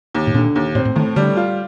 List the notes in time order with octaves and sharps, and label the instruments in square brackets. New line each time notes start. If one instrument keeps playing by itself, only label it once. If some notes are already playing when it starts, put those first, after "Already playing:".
[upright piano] D#2
[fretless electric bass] A2
[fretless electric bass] A#2 [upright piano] D3
[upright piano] D#2
[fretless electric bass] A2 [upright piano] C4
[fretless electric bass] A2
[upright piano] A2 [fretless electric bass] D#3
[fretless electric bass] D3 [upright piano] G3
[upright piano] F4